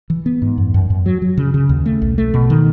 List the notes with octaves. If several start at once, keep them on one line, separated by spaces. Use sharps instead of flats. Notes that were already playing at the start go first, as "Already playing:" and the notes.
E3
B3
G#2
F#2
F#2
F#2
F#3
F#3
C#3
C#3
D#2
A3
B1
A3
B2
D#3